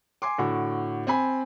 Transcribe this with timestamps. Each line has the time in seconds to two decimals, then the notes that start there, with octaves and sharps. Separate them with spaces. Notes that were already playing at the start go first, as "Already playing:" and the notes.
0.22 G#5 C6 D6
0.38 A2 D3 F#4
1.07 C4 G#5 B5